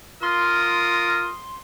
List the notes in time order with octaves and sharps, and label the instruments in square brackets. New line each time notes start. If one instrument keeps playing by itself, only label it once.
[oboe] F4 [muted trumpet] A#4 [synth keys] C6 [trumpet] D#6